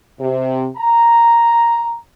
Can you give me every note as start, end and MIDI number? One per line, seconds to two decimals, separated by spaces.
0.20 0.67 48
0.77 1.97 82